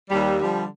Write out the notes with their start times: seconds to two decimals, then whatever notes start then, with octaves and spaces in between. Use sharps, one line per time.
0.10 D#2 G3
0.39 D3 F3 G3